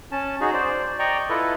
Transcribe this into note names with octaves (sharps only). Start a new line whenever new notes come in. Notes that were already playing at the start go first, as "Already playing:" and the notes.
C#4 A5
D#4 F#4 G#4
C5 D5
D5 D#5 G5 A#5 C#6
E4 F4 A4 B4 D#5